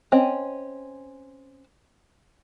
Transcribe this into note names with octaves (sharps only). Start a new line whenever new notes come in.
C4 C#4 D#5